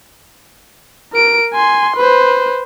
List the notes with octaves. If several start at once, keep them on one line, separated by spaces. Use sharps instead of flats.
A#4 D7
G#5 C6
B4 C5